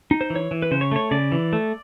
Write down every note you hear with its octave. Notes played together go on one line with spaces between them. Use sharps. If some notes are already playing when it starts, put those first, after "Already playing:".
D#4
C5
E3
C#5
E3
B4
C#3 C5
C#5
A3 C#5
C#3 D5
E3
A3